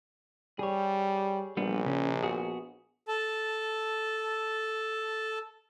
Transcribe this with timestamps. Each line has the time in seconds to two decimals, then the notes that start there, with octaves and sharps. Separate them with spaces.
0.59 G3 G#4 C#5
1.57 A#1 G3 B3 D4
1.86 C#3 C#4
2.23 B3 F#4 G#4
3.08 A4 A5